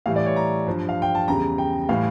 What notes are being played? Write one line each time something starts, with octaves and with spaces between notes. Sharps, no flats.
A2 E3 G3 F5
D5
C#5
A#5
G2 F3
F5
G5
A5
E2 C#3 G3 A#5
G5
A2 E3 G3 F5